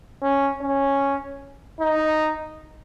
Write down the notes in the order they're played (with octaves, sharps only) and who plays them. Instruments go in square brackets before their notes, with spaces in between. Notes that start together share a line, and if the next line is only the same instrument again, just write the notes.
[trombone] C#4
C#4
D#4